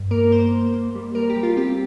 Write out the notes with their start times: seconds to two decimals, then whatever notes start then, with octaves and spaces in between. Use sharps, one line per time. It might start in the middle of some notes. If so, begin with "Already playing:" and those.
Already playing: G2
0.11 A#3 A#4
0.31 A#3 C5
0.52 A#3
0.74 A#3
0.95 G3
1.15 G3 A#4
1.30 G4
1.37 G3
1.43 F4
1.57 C4 G4